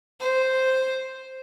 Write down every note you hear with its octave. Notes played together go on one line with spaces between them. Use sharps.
C5